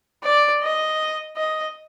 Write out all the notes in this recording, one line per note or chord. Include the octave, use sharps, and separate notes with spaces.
D5
D#5
D#5